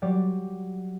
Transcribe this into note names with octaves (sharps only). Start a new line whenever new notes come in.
F#3 G3 D5